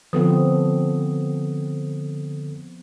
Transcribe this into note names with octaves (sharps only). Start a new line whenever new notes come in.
D3 F3 B3 C4 A4 D#6